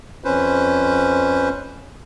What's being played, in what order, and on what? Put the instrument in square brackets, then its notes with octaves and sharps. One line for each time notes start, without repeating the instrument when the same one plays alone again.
[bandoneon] F2 C#4 B4 C5